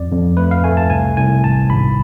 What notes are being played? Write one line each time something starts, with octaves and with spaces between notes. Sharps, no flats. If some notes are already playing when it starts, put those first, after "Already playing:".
Already playing: F2 D5
F2
A3 B4
F5
A3 G#5
A5
C2 G#5
C2 G#5
G#1 A5
G#1 B5